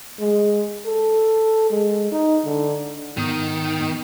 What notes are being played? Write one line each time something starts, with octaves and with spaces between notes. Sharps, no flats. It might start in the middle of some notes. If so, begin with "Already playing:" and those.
G#3
A4
G#3
D#4
D3
G#2 D#3 B3 D#6